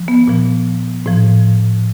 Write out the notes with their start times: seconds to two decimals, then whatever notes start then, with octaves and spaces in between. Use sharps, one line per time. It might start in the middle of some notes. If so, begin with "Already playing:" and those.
Already playing: F3
0.08 B3
0.28 A#2 F3
1.06 A2 F3